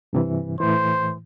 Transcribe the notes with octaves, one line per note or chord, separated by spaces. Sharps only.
G2 C3 E3
A2 E3 C5